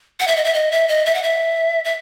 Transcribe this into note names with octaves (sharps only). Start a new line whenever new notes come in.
F#5
E5
D#5
E5
D#5
E5
D#5
E5
F#5
E5
E5